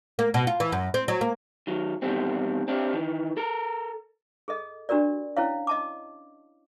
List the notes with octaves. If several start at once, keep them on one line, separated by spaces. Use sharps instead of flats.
A#3
B2
F4
E3
F#2
C4
F#3
A#3
D#3 F#3
E2 B2 D3 D#3 G3 C4
C4 D4 G4
D#3 E3
A4 A#4
G#4 A4 D#5
D4 F#4 G4 A#4 D5
C#4 E4 C#5 F5
D#5 A5 D6